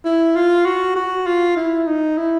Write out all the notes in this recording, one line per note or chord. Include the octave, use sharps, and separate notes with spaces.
E4
F4
F#4
F#4
F4
E4
D#4
E4